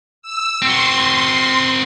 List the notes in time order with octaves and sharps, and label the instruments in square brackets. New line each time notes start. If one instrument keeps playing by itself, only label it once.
[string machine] E6
[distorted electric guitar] C4 F#4 [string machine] C6